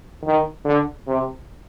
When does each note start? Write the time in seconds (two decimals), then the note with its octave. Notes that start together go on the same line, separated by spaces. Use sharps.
0.24 D#3
0.65 D3
1.07 C3